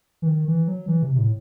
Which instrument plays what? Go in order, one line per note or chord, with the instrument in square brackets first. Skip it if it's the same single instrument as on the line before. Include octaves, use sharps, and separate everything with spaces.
[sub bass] E3
D#3
E3
F#3
E3
C3
C3
A2